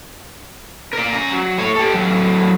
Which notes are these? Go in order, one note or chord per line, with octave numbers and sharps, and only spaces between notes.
A#4 D5
C#4 A#5
F#3
A2 C#5
G4 A4
A2 F#3